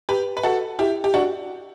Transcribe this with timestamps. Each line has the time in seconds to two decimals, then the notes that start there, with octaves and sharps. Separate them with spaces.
0.09 G4 B4
0.37 B4
0.43 F#4 A4
0.79 E4 G4
1.04 G4
1.14 D4 F#4